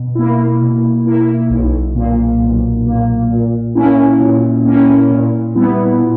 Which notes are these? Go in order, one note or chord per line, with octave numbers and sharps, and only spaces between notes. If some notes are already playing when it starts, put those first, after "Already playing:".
Already playing: B2
A#3 E4
B2
A#3 E4
B1
A#2 A#3
B1
A#2 A#3
A#2
A#3 C#4 E4
A#2
A#3 C#4 E4
A#2
G3 B3 E4
A#2